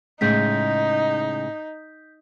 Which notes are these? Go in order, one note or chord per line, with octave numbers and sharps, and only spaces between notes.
A2 C#3 G#3 D#4 G6 B6